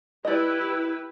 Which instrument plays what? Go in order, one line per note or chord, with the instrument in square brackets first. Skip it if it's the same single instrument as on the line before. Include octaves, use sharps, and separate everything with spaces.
[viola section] E4 G4 B4 [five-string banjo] D5 D#5